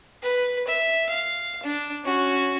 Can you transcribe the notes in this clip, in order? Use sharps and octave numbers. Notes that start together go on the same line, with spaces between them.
B4
E5
F5
D4
C#4 F#4